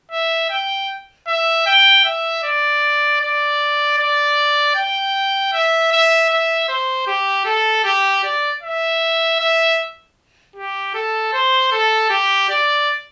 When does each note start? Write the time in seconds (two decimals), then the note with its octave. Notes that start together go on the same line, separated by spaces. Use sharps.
0.11 E5
0.50 G5
1.28 E5
1.66 G5
2.05 E5
2.43 D5
3.21 D5
3.98 D5
4.76 G5
5.53 E5
5.92 E5
6.29 E5
6.68 C5
7.07 G4
7.45 A4
7.84 G4
8.24 D5
8.63 E5
9.40 E5
10.56 G4
10.94 A4
11.33 C5
11.72 A4
12.10 G4
12.49 D5